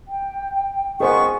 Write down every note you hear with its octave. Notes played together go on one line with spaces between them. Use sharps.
G5
D#3 B3 G#4 C5 F#5 G#5 C#6